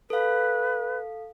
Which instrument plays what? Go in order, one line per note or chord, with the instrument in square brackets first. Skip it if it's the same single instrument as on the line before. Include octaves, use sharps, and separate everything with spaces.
[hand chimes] A4 F5 [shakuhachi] B4